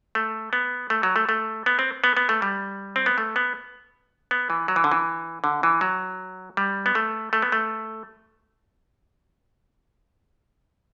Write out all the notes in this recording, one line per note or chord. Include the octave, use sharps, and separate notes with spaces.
A3
B3
A3
F#3
A3
A3
B3
C4
B3
B3
A3
G3
C4
B3
A3
B3
B3
E3
F#3
E3
D3
E3
D3
E3
F#3
G3
B3
A3
A3
B3
A3